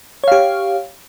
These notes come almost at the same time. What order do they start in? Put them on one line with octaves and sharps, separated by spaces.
C#5 F5 G4